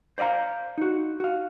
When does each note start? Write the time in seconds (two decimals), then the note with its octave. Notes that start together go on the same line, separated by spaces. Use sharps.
0.18 C5 D5 D#5 F5 A#5
0.78 D#4 F#4
1.20 F#4 F5